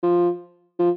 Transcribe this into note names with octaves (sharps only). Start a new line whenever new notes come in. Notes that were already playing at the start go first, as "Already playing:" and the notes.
F3
F3